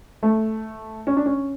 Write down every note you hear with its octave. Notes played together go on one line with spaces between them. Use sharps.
A3
C#4
D4
C#4